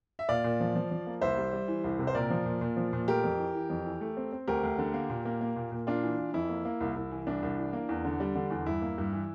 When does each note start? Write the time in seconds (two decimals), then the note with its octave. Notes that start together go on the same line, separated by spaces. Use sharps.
0.19 E5
0.29 A#2 D5 F5
0.44 A#2
0.60 F3
0.75 F3
0.91 F3
1.07 A#3
1.21 C2 C5 E5
1.37 G3
1.53 G3
1.68 E3
1.84 C2
1.99 C3
2.07 C5
2.15 A#2 A#4 D5
2.30 F3
2.45 A#2
2.61 A#2
2.76 F3
2.93 A#2
3.08 A3 G4 A#4
3.24 F2
3.39 E3
3.55 E3
3.70 F2
3.86 E3
4.01 A3
4.17 C4
4.32 C4
4.48 D2 G4 A#4
4.63 D2
4.78 D3
4.94 A#3
5.10 A#2
5.25 A#3
5.41 A#3
5.56 A#2
5.72 A#2
5.87 A#3 D4 F4
6.03 E3
6.18 E3
6.34 F2 E4
6.49 A#3
6.65 A#3
6.80 C2
6.96 C2
7.11 E3
7.27 C2 D4
7.42 C2
7.58 E3
7.73 A#3
7.89 E2
8.05 D3
8.20 G3
8.35 D3
8.50 E2
8.66 G2 E4
8.82 A#3
8.98 G2
9.13 E3